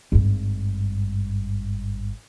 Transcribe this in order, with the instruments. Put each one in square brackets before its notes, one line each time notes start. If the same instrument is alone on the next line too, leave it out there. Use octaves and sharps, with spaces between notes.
[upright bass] G#1 G2